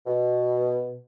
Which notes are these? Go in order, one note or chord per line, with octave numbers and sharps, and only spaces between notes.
B2